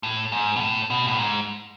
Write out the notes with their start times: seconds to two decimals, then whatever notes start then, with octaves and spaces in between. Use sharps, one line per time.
0.03 A2
0.32 G#2
0.56 B2
0.60 A2
0.90 B2
1.07 A2
1.19 G#2